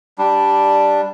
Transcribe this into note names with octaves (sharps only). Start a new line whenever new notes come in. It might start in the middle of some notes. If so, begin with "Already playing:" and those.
G3 D4